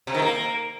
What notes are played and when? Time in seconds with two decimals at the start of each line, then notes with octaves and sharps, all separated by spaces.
0.07 C3
0.15 D#3
0.22 A#3